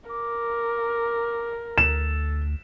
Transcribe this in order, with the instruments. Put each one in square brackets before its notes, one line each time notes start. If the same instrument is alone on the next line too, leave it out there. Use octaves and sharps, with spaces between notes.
[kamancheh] A#4 [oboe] D6
[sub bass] D2 [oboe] A4 [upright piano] E7